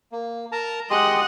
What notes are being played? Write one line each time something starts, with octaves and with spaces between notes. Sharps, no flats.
A#3
A#4 A5 A#5
G#3 G4 D#5 F#5 C6